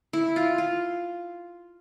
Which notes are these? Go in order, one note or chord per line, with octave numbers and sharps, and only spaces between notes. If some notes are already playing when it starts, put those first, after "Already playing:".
E4
F4
F4